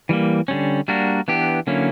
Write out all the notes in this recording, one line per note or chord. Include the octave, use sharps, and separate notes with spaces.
E3 G3 A#3
D3 G3 C#4
G3 A#3 D4 F#4 A#4
E3 B3 D4 G4
D3 F#3 A#3 C#4 E4